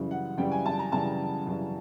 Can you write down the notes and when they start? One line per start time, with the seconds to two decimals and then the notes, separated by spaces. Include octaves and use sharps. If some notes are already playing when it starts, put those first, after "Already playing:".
Already playing: F#2 C#3 E3 G3
0.11 F#5
0.38 F#2 C#3 E3 G3 G5
0.52 G#5
0.66 A5
0.79 A#5
0.92 F#2 C#3 E3 G3 A5
1.47 F#2 C#3 E3 G3